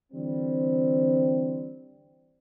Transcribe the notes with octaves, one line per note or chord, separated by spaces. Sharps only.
D3 E3 G3 C4